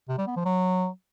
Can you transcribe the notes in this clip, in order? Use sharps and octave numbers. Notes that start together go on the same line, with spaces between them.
C3
G3
B3
F3
F#3